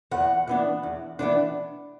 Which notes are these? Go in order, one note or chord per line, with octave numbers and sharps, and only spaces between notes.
E2 F#5
E3 B3 D4
E2
E3 B3 D4